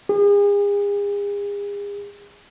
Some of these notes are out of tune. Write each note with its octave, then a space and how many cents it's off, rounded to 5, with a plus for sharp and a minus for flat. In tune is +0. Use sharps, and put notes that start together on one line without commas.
G#4 -40